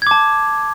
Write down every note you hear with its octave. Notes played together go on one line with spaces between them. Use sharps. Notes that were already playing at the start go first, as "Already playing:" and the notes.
A5 D6 G#6